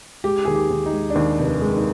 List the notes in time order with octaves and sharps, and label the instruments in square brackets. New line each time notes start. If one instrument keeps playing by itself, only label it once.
[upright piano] G#3 [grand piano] G4
[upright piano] D#2 [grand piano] G#4
[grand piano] G4
[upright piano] D#2
[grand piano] D#4
[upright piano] G#3
[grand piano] D4
[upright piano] D#2 [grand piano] D#4
[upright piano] F1
[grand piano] D4
[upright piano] G#3
[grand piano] D#4